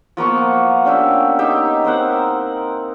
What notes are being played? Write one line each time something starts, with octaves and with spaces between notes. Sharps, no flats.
F3 A#3 B3 C#6
C#4 D4 G4 E5
D#4 G4 E5
C4 A#4 C5 F#5